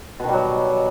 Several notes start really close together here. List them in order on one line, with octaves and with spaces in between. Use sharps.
B2 D#3 G3 F#3